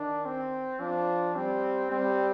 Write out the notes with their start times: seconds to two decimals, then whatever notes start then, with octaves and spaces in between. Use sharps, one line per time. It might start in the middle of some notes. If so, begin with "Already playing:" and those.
Already playing: D#3 D4
0.25 C4
0.80 F3 D4
1.35 G3 C4
1.91 G3 C4